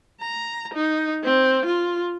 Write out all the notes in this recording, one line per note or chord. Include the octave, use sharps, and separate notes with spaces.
A#5
D#4
C4
F4